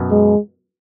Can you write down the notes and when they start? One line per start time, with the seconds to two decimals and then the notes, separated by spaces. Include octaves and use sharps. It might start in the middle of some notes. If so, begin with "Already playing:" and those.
Already playing: F#2 B2
0.11 G#3